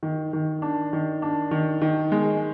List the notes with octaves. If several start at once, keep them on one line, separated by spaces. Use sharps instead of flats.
D#3
D#3
D4
D#3
D4
D#3
D#3
G#3